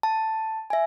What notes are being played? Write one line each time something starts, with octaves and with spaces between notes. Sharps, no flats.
A5
E5 G#5